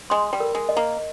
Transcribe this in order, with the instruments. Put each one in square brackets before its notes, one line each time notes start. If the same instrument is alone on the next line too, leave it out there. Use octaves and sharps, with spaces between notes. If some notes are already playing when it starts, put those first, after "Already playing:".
[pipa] G#3 [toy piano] C6
[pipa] G3
[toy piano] A#4
[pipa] G#3
[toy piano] D#5
[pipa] A#3